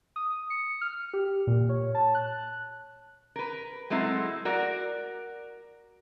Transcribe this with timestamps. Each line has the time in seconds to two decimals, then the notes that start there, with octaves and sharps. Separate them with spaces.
0.16 D#6
0.50 C#7
0.81 F6
1.13 G4
1.47 A#2
1.69 C#5
1.95 A5
2.15 F#6
3.36 A#4 B4
3.90 F#3 G#3 A3 C4 E4
4.45 F#4 A#4 D5